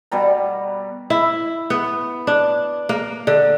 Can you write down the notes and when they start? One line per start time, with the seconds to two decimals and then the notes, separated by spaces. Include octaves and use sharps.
0.12 B2 G3 A#5
1.10 E4
1.70 B3
2.27 D4
2.89 A#3
3.27 D3